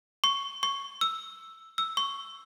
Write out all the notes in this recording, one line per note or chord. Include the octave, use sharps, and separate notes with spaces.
C#6
C#6
E6
E6
C#6